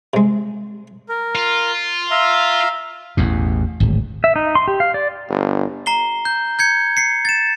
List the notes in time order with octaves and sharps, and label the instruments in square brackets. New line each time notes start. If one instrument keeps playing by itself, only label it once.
[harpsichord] C3 G#3
[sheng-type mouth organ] A#4
[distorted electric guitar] F4
[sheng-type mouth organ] E5 F5 A#5
[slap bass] A1 E2 B2
D1 G#1
[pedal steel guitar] E5
D#4
C6
G4
F5
D5
[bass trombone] G1
[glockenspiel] A#5 C7 G7
G6
G6 G#6 C#7
C7 C#7
A6 E7